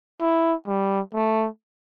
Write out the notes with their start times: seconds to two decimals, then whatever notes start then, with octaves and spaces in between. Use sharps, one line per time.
0.21 E4
0.67 G3
1.14 A3